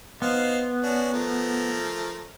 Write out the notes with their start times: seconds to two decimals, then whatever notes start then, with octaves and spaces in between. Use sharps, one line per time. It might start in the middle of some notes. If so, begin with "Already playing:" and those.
0.22 B3 D#4 C5 F5
0.83 C#4 D4 F#4
1.13 F3 A3 A#4